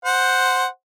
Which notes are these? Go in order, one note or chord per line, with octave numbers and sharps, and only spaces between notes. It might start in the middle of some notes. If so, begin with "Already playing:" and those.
C5 F#5